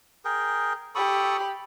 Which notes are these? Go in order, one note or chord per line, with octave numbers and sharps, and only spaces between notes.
G#4 A#4 G5
G4 A4 B5 C#6 D#6